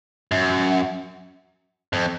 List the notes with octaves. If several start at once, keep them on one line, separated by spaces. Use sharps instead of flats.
F#2
F2